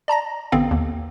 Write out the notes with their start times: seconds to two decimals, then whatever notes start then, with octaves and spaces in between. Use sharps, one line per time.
0.08 D5 A5 A#5 A#6
0.52 A1 D3 B3 C4 F5
0.71 D#2